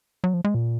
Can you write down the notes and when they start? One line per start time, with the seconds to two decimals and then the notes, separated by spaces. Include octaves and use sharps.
0.24 F#3
0.34 F3
0.44 G#3
0.55 A#2